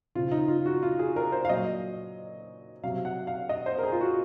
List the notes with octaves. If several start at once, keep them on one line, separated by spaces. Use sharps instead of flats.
C#3 F3 F4
D#4
F4
F#4
F4
G#4
A#4
C5
F5
A#2 F#3 D#5
C3 F#3 F5
F#5
F5
D#5
C5
A#4
G#4
F4
F#4